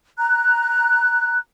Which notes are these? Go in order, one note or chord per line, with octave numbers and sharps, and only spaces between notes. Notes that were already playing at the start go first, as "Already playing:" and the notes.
A#5 F#6